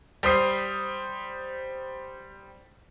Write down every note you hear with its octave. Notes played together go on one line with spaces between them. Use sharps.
G3 C5 D#6 C7